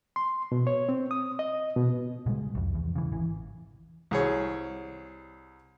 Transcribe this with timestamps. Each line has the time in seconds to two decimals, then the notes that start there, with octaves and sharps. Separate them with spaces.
0.16 C6
0.52 B2
0.67 C#5
0.89 C4
1.11 D#6
1.39 D#5
1.77 B2
2.26 A#2 C#3 G3 G#3
2.55 C2 F2
2.75 E2
2.95 C#3 E3
3.12 G#1 E3
4.11 C2 G#4 C#5